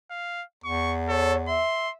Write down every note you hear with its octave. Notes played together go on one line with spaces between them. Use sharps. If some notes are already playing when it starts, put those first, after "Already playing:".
F5
E2 C#6
A4 C#5
E5 C6